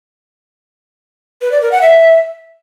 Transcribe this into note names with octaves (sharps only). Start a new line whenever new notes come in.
B4
D5
A#4
F#5
E5